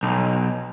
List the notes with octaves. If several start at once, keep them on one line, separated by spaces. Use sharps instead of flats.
B1